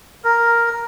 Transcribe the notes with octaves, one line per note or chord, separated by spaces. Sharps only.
A#4